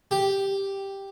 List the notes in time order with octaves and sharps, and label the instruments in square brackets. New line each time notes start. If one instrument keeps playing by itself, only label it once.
[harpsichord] G4